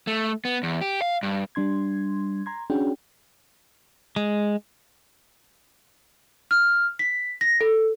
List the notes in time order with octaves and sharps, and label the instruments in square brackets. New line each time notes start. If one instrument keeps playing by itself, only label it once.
[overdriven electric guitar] A3
B3
E2
G4
F5
G2
[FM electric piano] G3 D4 C6 G#6
A#5 C6 G#6
C#4 D4 F#4 G#4 G5
[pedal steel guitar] G#3
[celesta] F6
B6
A#6
A4